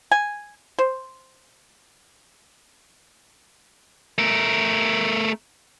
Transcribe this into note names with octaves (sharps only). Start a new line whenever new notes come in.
G#5
C5
A3 A#4